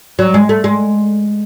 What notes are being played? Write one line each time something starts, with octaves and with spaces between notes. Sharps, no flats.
F#3
G#3
A3
G#3